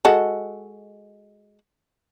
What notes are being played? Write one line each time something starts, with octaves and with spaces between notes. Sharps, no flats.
G#3 F#4 A4